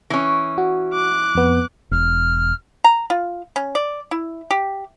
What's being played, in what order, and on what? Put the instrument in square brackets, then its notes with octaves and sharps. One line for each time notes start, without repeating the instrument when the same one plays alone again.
[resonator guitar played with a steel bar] E3 C#4
[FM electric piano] F#4
[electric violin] D6 F#6
[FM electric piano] F2 B3
[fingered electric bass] E1 [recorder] F6
[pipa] A#5
F4
C#4
D5
E4
G4